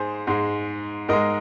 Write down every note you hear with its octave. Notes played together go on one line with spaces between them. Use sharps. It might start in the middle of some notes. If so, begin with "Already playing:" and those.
Already playing: G#2 G#4 C5
G#2 G#3
G#2 G#3 A#4 D#5